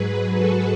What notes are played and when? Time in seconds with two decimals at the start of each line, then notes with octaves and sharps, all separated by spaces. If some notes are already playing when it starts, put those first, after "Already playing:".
Already playing: G#2 F#3 G#4 B4
0.35 F#4 A4